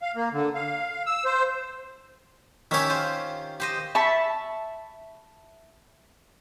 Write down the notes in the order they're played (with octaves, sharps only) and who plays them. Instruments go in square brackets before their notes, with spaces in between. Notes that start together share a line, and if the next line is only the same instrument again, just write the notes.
[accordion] F5
A#3
D3
F5
E6
C5
[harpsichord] D#3 C#4 C#5 [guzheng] G4 E5
[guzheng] F4 C5
G4 C5 D#5
[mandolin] E5 A5 B5 C#6